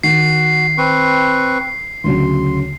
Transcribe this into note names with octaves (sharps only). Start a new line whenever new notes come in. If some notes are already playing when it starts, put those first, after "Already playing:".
D#3 F#4 C7
C4 B4 C#6
D2 C#3 F#3 C6